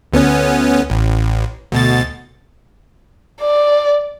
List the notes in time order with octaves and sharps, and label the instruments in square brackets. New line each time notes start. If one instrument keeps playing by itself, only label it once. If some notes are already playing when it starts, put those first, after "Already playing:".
[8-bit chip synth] D2 B3 C#4
A1
D2 B2 A6
[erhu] D5